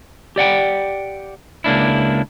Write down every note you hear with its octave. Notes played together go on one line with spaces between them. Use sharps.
G4 D5 F#5 G5
C#2 A#3 D4 E4